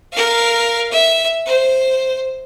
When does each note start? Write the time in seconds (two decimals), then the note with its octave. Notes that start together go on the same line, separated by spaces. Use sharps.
0.12 A#4 F5
0.90 E5
1.46 C5